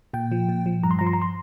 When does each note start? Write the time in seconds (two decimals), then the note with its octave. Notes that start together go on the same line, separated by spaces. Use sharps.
0.13 A#2 G5
0.32 F3
0.49 A#2
0.66 F3
0.83 G2 A#5
0.91 C6
0.99 F3 A#5
1.07 C6
1.13 A#5
1.22 C6